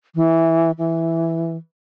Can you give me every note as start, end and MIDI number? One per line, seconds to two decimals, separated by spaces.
0.15 0.71 52
0.78 1.56 52